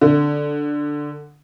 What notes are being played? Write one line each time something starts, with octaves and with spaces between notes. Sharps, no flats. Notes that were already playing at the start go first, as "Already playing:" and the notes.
D3